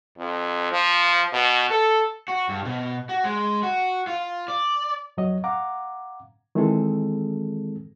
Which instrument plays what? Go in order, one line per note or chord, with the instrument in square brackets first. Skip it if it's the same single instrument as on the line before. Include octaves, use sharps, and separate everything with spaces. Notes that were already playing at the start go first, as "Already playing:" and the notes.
[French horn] F2
F3
B2
A4
[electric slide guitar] F#4
G2
B2
F#4
G#3
F#4
F4
D5
[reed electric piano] F2 F#3 C#5 D#5
F5 F#5 A#5 D6
D#3 E3 G#3 C4 G#4 A4